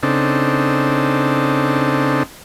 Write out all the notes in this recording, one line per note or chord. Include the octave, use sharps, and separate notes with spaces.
C#3 C4 D4 D#4 A4